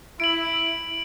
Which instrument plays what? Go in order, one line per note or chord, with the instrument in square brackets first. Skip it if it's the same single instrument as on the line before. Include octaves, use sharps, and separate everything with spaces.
[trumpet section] E4 [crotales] D7 F#7